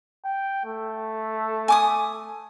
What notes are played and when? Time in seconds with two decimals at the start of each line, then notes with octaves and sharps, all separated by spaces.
0.25 G5
0.65 A3
1.68 G#5 D6 D#6